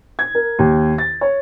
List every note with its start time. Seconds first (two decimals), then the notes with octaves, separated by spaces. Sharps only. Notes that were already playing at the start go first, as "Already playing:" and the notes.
0.19 G#6
0.35 A#4
0.59 D#2
0.98 A6
1.21 C#5